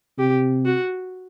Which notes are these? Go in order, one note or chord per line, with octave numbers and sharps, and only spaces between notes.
C3 G4
F#4